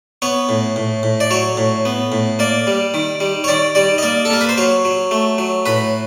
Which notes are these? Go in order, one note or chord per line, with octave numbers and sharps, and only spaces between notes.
B3 C#5
A2
A2
A2
D5
F#3 C#5
A2
B3
A2
A#3 D5
G3
D#3
G3
C#5
D#3 D5
G3 D5
D#5
A#3 D5
A4
A#3 A#4
B4
C5
F#3 C#5
F#3
A3
F#3
A2 B4